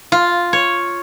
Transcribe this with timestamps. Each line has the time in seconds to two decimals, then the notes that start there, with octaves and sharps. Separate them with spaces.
0.12 F4
0.53 C#5